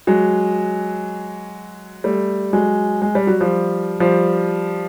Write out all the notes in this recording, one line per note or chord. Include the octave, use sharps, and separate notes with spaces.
F#3 G#3
G3 A3
F#3 G#3
G#3
G3
F#3
F3 G3
F3 G3